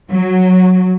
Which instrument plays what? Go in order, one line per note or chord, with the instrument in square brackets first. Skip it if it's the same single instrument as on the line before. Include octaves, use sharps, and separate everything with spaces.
[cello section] F#3